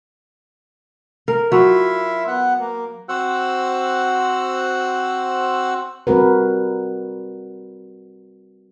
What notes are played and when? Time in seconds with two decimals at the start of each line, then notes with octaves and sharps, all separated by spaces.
1.28 A#4
1.52 F#3 E4 F4 E5
2.27 B3 F#5
2.60 A#3
3.09 C4 F#4 C5 F#5 E6 F#6
6.07 G3 C4 F#4 A#4 B4